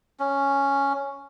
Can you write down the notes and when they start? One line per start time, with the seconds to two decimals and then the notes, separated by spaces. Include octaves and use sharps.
0.20 C#4